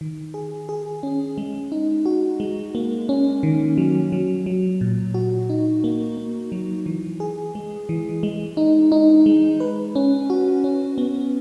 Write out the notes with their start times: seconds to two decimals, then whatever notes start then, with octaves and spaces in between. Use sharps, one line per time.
0.01 D#3
0.34 G#4
0.69 G#4
1.03 C#4
1.38 G#3
1.72 D#4
2.06 F#4
2.40 G#3
2.75 A#3
3.09 C#4
3.43 D#3
3.78 F#3
4.12 F#3
4.46 F#3
4.81 A#2
5.14 F#4
5.50 D#4
5.84 A#3
6.17 A#3
6.52 F#3
6.86 E3
7.20 G#4
7.55 G#3
7.89 E3
8.23 G#3
8.57 D#4
8.92 D#4
9.26 G#3
9.60 B4
9.95 C#4
10.30 F#4
10.64 C#4
10.98 B3